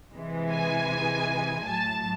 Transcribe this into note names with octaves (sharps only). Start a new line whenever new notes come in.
C3 E3 G#3
G#5
A2 F#3 A5